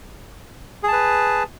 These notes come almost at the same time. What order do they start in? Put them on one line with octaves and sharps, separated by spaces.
G#4 A5 B4